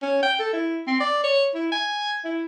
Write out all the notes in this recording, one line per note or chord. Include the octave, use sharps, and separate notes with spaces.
C#4
G5
A4
E4
C4
D5
C#5
E4
G#5
E4